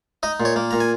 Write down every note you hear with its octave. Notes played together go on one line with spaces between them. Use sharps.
D#4 D#5
A#2
C#5
A#3
A#2 A#5
G#5